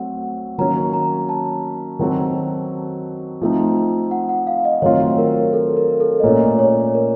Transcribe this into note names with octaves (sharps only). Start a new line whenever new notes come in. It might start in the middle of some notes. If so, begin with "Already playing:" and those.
Already playing: F#3 A3 C4 F#5
D#3 F#3 A#3 C#4 A#5
A#5
A5
D#3 F#3 C4 F#4 A4
F3 A3 C4 D#4
F#5
F#5
F5
D#5
D#3 F#3 A3 C4 F4 C#5
A#4
A4
A#4
A4
D#5
A#2 A3 C#4 C#5
C#5
A#4